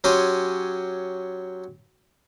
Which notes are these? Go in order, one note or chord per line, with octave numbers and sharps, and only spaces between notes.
F#3 C#4 G4 G#5 C6